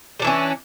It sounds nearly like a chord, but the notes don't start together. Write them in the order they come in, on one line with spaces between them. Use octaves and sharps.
G3 D4 E3 C#4